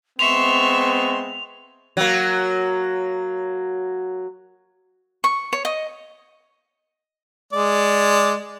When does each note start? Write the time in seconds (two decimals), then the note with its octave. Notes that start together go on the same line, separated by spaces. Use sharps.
0.19 G#3 B3 C4 E5 C6 C#6 F7
1.97 F#3 A#3
5.24 C#6
5.53 C#5
5.65 D#5
7.53 G#3 D5